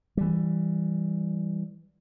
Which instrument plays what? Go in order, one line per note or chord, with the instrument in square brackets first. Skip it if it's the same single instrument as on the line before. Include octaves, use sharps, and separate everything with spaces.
[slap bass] E3 G3